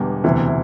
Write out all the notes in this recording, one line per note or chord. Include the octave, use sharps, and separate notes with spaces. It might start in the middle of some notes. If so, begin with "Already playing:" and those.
Already playing: E1 E2 D3 G3
E1 D2 C3 E3